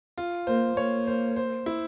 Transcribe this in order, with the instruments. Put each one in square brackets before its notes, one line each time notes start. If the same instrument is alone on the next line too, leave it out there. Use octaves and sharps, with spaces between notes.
[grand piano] F4
[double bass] A#3 [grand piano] C5
[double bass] A#3 [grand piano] C#5
[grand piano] C5
C5
E4